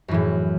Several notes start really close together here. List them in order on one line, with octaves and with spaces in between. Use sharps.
F#2 E3 A2